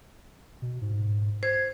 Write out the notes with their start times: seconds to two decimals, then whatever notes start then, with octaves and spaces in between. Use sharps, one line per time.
0.62 B2
0.81 G#2
1.43 C5 G#6